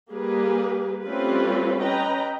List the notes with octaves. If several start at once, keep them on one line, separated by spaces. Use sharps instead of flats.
G3 A#3 G4 G#4 B4
G3 A3 C4 C#4 F4 B4
C#4 B4 D#5 G5 A#5